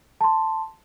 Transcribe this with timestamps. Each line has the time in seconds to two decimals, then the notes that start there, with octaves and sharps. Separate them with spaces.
0.21 A5 C6